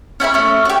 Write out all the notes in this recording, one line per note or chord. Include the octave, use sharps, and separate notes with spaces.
C#4 E4 G#5 B5
A3 C#4
F#4 G4